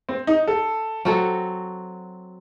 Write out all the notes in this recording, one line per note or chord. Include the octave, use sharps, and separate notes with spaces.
C4
D#4
A4
F#3 C4 F#4 A4